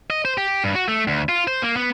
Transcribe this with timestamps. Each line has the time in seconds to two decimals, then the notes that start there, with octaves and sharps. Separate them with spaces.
0.10 D#5
0.25 C5
0.38 G4
0.64 G2
0.75 F#4
0.88 A3
1.08 D2
1.29 F4
1.47 C5
1.62 A#3
1.76 B3